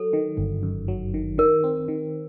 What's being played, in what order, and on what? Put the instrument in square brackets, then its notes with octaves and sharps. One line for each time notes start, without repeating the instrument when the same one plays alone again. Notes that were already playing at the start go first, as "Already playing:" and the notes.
Already playing: [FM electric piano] F#3 [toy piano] A4
[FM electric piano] D#3
G1
F#2
F#3
D#3
[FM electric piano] D#3 [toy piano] A#4
[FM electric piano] C4
D#3